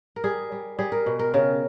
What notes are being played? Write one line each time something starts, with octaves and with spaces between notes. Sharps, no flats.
A#4
G3 G#4
G3
G3 G#4
A#4
B2
A#4
C#3 A#4